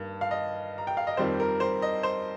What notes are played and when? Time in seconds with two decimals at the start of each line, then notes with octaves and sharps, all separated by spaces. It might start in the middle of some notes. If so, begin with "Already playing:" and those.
Already playing: G2 D#3 A#3
0.21 F5
0.31 D#5
0.78 A#5
0.87 G5
0.97 F5
1.07 D#5
1.17 F2 D#3 G3 C4 C5
1.40 A#4
1.60 C5
1.82 D#5
2.03 C5